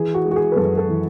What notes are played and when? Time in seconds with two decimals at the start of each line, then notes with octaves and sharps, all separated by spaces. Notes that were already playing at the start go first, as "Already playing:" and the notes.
Already playing: E3 G#4
0.14 F#4
0.25 G#3
0.31 F#4
0.36 G#4
0.52 B4
0.56 F#2 A4
0.77 A4
0.88 E3